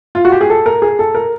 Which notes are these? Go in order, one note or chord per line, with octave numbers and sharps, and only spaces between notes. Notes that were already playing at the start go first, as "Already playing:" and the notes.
F4
F#4
G4
G#4
A4
A#4
G#4
A4
A#4